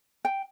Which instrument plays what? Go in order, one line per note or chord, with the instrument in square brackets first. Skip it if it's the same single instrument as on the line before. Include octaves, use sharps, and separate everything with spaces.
[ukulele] G5